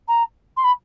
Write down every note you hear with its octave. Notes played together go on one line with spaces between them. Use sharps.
A#5
C6
B5